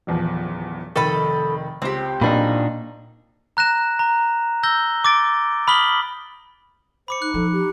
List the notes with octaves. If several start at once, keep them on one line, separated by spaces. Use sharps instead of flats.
D#1 E2 F3
F1 D#3 A4 D#5 B5
C#2 C4 G4
B1 A#2 A#3 D4 D#4 B5
A#5 F#6 A#6 E7
A#5
E6 G6 A#6 G7
D6 A6 D7
B5 D#6 F6 B6 F#7 G7
C5 B5 D6 C#7
D#4 F#6
F3 A4
G4